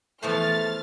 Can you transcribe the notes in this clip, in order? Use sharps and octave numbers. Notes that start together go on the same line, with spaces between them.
E2 F3 A3 C5 F6 A6